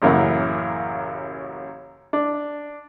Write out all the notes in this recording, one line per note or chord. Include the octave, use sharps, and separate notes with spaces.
A1 F#2 C#3 A#3 E4 F#5
D4